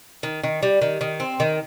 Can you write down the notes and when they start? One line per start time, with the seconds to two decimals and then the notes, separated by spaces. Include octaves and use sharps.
0.23 D#3
0.44 D#3
0.63 G3
0.82 D#3
1.01 D#3
1.20 C4
1.40 D#3